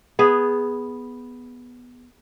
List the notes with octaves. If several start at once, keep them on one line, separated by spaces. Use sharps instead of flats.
B3 G#4